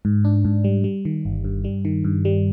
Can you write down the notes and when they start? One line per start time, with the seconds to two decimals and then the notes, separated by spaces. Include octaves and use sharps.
0.05 G#2
0.25 D4
0.45 G#2
0.64 G3
0.84 G3
1.05 D#3
1.25 G1
1.44 G2
1.64 G3
1.85 D#3
2.04 G2
2.25 G3